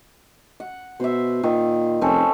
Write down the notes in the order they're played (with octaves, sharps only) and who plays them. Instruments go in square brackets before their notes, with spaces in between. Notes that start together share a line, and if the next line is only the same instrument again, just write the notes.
[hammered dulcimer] F#5
[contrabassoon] B2 [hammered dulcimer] C5 E5
[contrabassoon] A#2 [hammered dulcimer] D#3
[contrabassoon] F1 [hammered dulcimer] C4 C#4 A4